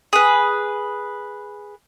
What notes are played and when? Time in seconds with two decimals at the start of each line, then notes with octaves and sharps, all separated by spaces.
0.13 G#4 B4